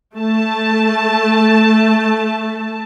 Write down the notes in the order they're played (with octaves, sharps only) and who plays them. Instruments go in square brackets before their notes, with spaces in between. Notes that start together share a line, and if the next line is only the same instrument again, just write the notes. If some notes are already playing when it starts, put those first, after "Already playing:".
[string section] A3 A5